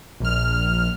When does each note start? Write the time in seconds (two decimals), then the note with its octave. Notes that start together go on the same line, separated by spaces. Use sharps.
0.20 A#1 F6